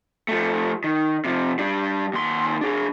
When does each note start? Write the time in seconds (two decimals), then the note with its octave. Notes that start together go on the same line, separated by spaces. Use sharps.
0.29 F3 A3
0.84 D#3
1.25 C3 F3
1.59 G3 D4
2.13 D#2 C6
2.61 D4 G#4